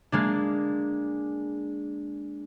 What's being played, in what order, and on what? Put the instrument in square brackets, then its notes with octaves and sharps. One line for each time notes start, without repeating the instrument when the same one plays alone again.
[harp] G#3 A#3 D4